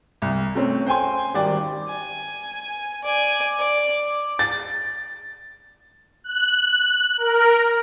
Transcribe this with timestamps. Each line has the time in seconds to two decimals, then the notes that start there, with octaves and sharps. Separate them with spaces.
0.22 C2
0.55 A3 C4 C#4
0.86 C5 G5 G#5 C6
1.34 G#1 G3 D5 G5
1.89 G#5
3.03 D5 G#5
3.59 D5
4.39 A6
6.24 F#6
7.18 A#4